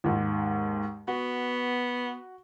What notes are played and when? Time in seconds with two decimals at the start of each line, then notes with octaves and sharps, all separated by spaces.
0.04 D#2 G#2
1.07 B3 F#4